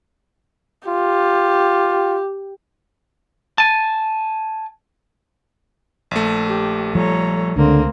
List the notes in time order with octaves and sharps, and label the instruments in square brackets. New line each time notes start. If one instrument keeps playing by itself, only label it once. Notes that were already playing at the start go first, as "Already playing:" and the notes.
[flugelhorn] F4 [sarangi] G4
[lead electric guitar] G#5 A5
[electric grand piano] A#1 A3
[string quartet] G4
[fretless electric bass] F3 G3 [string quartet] A4 C#5 A#5
[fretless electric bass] C#2 [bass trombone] D3 [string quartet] A3 A#3 C4